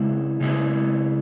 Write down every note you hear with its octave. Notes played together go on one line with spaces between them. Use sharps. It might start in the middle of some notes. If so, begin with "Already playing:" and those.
Already playing: C#3 G#3 E4
C#3 G#3 E4